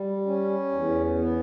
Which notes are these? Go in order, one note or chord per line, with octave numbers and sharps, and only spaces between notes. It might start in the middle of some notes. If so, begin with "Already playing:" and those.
Already playing: G3
C#4
E2
B3